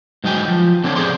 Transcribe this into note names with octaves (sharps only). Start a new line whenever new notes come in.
G#2 F#3 D#4 G5 G#5
F3
D3 C4 D4 B4 C#5
C3 C4 G#4 C5 D5 C6